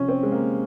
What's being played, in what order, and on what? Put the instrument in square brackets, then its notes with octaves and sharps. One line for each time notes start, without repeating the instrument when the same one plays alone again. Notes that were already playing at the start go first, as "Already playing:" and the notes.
Already playing: [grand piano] C3 F3 C#4
C4
G#3
A#3